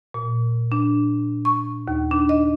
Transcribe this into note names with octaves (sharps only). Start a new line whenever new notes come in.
A#2
D4
C#6
D#2
D4
D#5